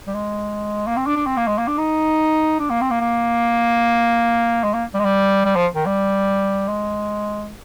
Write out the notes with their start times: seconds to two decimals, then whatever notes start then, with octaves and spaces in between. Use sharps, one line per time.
0.07 G3
0.14 G#3
0.87 A#3
0.97 C4
1.06 D4
1.17 D4
1.26 C4
1.37 A#3
1.47 G#3
1.58 A#3
1.67 D4
1.78 D#4
2.60 D4
2.70 A#3
2.81 C4
2.90 A#3
3.01 A#3
4.63 G#3
4.74 A#3
4.94 G3
5.00 G#3
5.05 G3
5.45 G3
5.56 F3
5.75 D#3
5.86 G3
6.68 G#3